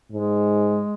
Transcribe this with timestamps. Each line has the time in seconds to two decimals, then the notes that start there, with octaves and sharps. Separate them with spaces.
0.12 G#2 G#3